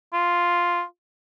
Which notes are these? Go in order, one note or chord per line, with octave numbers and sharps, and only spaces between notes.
F4